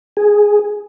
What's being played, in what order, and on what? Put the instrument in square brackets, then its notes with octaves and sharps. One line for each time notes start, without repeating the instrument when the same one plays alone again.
[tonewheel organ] G#4